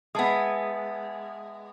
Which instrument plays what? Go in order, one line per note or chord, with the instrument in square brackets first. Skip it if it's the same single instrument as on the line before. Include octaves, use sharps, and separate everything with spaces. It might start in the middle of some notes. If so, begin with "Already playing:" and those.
[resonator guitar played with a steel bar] G#3 B3 [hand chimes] E5 A5 D#6